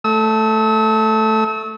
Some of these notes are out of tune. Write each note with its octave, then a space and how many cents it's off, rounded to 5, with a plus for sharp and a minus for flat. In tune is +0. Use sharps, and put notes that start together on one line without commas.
A3 +0 E6 -40